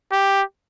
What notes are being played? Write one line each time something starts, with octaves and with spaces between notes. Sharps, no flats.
G4